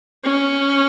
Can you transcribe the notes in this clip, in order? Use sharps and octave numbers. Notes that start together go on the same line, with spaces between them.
C#4